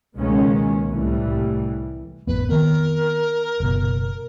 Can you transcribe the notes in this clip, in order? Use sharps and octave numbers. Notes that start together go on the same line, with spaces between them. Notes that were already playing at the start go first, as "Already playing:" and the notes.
C#2 B2 D#3 G#3 A#3 C#4
C2 A2 E3 G3 A3
A1 F2 B3 B4
D#3 B3 C4 A#4
F#1 B2